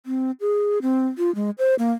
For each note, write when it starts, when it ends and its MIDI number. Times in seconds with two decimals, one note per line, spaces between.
0.06 0.31 60
0.41 0.78 68
0.82 1.07 60
1.18 1.33 65
1.35 1.50 56
1.58 1.75 72
1.79 1.92 58